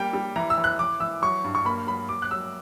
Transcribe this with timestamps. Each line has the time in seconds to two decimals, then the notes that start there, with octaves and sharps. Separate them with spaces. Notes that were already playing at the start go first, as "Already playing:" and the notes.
Already playing: G3 A#3 G5
0.13 G3
0.36 E3 A#5
0.50 E6
0.58 E3
0.64 F#6
0.79 E3 D6
1.00 E3 E6
1.22 F#3 C#6
1.44 G2
1.55 C#6
1.65 A#3 B5
1.87 F#3 B5
2.09 F#3 D6
2.22 F#6
2.31 F#3 E6